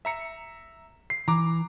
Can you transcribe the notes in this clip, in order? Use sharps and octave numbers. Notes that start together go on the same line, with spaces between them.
E5 A#5 C#7
C7
E3 A#5 D6